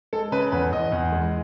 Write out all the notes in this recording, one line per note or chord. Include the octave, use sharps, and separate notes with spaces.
G#3 A4
C#3 B4
E2 B4
E2 D#5
E2
G#3